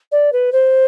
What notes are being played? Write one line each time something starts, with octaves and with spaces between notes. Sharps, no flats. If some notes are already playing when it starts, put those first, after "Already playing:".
D5
B4
C5